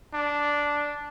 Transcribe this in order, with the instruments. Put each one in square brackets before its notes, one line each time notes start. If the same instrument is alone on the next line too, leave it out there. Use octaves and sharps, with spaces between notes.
[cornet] D4